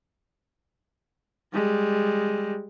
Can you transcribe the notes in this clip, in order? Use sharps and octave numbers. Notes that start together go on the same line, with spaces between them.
G3 G#3